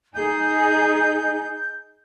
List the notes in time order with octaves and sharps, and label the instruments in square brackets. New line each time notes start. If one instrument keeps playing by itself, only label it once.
[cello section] D#4 G#4 [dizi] G6